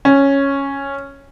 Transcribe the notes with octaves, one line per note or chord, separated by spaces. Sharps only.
C#4